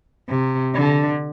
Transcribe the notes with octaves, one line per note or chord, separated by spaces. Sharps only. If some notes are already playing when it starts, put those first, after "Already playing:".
C3
D3